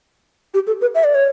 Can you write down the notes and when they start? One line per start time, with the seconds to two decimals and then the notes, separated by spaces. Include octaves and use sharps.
0.54 G4
0.67 A4
0.81 B4
0.95 E5
1.04 D5
1.14 C#5